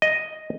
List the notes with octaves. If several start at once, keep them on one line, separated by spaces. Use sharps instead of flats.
D#5